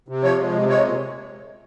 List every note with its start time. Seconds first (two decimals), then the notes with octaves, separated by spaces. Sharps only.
0.08 C3
0.23 F3 C#5
0.39 G#3
0.54 C3
0.69 G#3 C#5
0.84 A#2